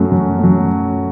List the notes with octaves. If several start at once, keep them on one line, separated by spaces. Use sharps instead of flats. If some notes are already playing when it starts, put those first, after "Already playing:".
Already playing: F#2 F#3 A3
F#2
F#3 A3